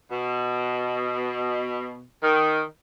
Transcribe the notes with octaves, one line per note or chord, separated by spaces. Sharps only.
B2
D#3